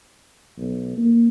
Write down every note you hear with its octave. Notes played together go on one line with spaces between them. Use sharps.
B1
A#3